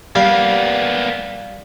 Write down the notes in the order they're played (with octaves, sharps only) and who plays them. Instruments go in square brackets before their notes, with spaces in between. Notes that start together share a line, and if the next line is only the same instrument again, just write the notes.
[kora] G3 [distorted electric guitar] A#3 B3 [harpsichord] F5